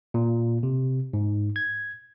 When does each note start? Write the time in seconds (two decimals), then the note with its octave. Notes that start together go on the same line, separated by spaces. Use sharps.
0.14 A#2
0.63 C3
1.13 G#2
1.56 G#6